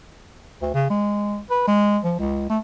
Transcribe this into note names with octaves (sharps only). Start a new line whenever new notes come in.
D2
C#3
G#3
B4
G#3
F3
C#2
A3